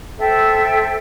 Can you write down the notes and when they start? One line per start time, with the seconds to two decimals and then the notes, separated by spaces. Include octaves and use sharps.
0.19 A4 C5 E5 G5